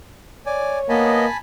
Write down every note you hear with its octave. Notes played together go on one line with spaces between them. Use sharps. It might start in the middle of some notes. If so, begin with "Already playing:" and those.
C#5 D5 G#5
A#3 B3 D#5 G#5 A5 B5